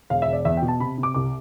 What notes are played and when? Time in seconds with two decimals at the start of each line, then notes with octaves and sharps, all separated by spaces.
0.10 E1 F5
0.22 E5
0.27 E1
0.33 D5
0.45 E2 E5
0.57 B2 G5
0.68 A5
0.80 C3 B5
0.98 C3
1.03 D6
1.14 C2 D6